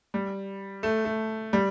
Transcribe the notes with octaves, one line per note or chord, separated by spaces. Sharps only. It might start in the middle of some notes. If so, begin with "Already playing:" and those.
G3
A3
A3
G3